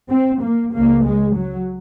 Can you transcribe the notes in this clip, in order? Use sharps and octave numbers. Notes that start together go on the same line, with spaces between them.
C4
A#3
C#2 C#3 A#3
G#3
F#3